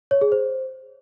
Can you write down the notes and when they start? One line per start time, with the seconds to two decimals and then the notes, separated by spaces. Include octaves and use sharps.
0.11 C#5
0.21 G#4
0.32 C5